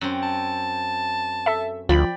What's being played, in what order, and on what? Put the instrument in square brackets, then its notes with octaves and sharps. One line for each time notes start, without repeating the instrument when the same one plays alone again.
[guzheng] F#2 C4
[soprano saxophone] A5
[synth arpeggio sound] A4 E5
[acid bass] D2 [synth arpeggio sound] F3 [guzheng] D5 G5 B5